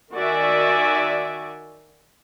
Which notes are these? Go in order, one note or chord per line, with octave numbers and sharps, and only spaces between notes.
D#3 F#4 D5 E5 G#5